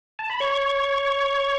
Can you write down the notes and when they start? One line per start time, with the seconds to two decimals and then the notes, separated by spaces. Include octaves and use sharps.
0.19 A5
0.30 B5
0.40 C#5 C#6